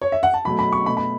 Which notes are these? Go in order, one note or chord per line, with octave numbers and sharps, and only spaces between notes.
C#5
E5
F#5
A5
B2 F#3 A3 B5
B5
C#6
B2 A3 B5
B5